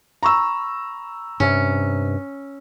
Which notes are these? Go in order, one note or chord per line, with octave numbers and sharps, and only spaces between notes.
A#5 B5 C#6 E6
G2 C3 C#4